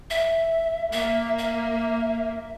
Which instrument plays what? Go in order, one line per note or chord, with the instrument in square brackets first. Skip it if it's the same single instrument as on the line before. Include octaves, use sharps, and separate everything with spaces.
[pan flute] E5
[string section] A#3 [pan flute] E5
[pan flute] E5